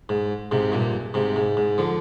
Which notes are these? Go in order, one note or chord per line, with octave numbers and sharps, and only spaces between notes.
G#2
G#2 C3
G2 A#2
G#2 C3
G#2
G#2
D3 F3